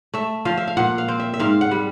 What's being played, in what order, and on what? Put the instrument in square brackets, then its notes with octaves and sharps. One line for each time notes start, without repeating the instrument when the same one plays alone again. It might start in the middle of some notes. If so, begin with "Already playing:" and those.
[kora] A3 E5
F3 F5
E5
F5
A#2 F#5
F5
C4
E5
E5
G#2 F5
F#5
G3